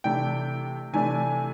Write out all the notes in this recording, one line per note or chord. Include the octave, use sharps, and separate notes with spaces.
C3 E3 A3 D4 G5
C3 E3 A3 D4 G#5